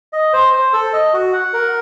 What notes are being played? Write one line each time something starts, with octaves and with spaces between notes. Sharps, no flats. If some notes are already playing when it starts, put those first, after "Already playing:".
D#5
C5
C5
A4
D#5
F#4
F#5
A#4